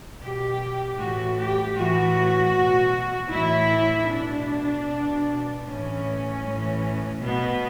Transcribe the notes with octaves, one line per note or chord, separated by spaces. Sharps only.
B2 G4
A2 E3 F#4
G4
A2 E3 F#4
B2
A2 E3 E4
B2 D4
B2
A2 E3 C#4
A2 E3
B2 B3